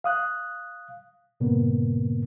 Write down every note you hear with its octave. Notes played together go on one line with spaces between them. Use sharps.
F5 D#6 F#6
G2 A#2 C#3 A#3 B3